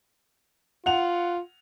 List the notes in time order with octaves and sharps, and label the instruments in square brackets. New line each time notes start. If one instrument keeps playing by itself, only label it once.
[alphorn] F4 [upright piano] F#5 F7